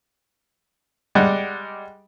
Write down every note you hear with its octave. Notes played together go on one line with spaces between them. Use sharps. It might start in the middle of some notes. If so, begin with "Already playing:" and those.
G3 G#3 D5 F#5